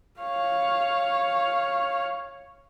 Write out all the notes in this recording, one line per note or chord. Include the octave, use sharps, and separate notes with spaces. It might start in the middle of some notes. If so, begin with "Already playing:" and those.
C#5 F5